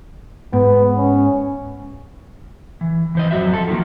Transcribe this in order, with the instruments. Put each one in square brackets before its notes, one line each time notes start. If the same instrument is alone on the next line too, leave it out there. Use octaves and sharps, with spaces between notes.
[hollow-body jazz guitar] G#2 [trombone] B3
[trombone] C#4
[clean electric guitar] E3
E3 C5 D#5
F2 F#3 F#4 E5
F3 A4
D#3 F3 F#3 A#3